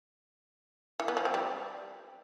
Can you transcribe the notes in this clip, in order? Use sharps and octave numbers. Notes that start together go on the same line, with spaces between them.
E3
B3
F3
C4
G3